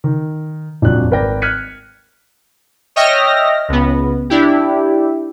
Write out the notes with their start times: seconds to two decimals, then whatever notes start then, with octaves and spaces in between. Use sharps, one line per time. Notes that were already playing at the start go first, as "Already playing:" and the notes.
0.04 D#3
0.82 D#1 F2 F#3 D4 F#6
1.10 G#1 A#4 B4 D5 G5 A#6
1.42 F6 F#6 G#6 B6 C#7 D#7
2.96 C#5 D#5 E5 G5 F6 A#6
3.69 C#2 B3
4.30 D4 E4 G4